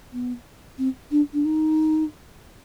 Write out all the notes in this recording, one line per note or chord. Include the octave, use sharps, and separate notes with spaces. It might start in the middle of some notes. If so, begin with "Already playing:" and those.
B3
C4
D4
D4
D#4